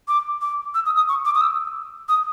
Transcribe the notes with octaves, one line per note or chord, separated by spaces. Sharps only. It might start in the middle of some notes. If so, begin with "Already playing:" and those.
D6
D6
E6
D#6
D#6
C#6
D6
D#6
E6
D#6